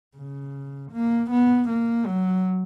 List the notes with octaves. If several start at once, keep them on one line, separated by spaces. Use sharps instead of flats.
C#3
A#3
B3
A#3
F#3